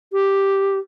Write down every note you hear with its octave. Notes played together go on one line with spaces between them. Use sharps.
G4